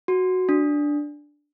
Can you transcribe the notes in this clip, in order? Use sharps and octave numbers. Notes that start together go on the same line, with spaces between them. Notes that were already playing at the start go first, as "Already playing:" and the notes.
F#4
D4